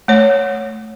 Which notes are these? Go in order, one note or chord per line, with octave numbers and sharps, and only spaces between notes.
A3 C#5